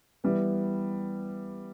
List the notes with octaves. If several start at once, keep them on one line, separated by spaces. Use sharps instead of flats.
E3 G3 B3